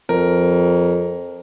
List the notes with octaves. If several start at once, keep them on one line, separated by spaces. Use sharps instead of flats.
F2 A#4